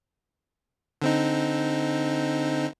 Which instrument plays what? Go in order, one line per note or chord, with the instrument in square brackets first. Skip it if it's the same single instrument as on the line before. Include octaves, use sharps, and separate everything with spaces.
[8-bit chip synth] D3 C4 D#4